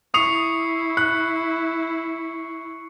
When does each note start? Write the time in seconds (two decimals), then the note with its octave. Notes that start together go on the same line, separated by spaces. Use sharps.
0.14 E4 C#6 D#6 C7 C#7 F7
0.97 F#6 C#7